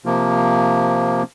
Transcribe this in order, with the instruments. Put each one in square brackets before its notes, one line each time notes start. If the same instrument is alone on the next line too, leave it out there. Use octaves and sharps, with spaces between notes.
[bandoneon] C3 F3 A#3